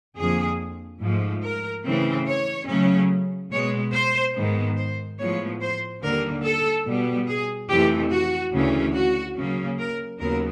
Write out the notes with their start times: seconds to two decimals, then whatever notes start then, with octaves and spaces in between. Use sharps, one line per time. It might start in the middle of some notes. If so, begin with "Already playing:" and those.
0.17 F2 D3 F3 A#3 G#4
1.01 G#2 F3 A3
1.43 A#4
1.85 C#3 E3 A3 C4
2.26 C#5
2.68 C#3 F#3 A3 C#4
3.51 B2 G#3 B3 C#5
3.93 C5
4.35 G#2 D#3 G#3 B3
4.77 C5
5.19 A2 F3 G#3 B3 C#5
5.60 C5
6.02 D#2 D3 G3 A#3 A#4
6.44 A4
6.86 B2 G3 B3
7.28 G#4
7.69 F2 C3 E3 A3 G4
8.11 F#4
8.53 D2 C#3 E3 A3 C#4
8.94 F#4
9.36 C#3 F#3 A#3 C#4
9.78 A#4
10.20 D#2 C#3 F#3 B3 A#4